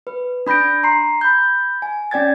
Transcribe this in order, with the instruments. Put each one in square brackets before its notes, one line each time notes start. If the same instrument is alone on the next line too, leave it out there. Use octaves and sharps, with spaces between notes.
[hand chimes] B4
D4 B5 G6 A#6 D7
A#5 C6 C7
B5 G6
G#5
C#4 D5 G5 G#6 A6